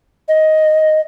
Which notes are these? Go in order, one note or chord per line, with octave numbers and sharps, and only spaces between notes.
D#5